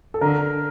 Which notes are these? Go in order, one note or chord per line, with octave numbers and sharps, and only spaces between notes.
A4
D3 A#4